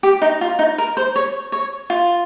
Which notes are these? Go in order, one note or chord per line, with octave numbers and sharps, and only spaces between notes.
G4
D#4
F4
D#4
A#4
C5
C#5
C#5
F4